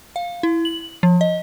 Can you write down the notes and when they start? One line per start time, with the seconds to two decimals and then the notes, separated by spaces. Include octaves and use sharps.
0.16 F5
0.43 E4
0.65 F#7
1.03 F3
1.21 D#5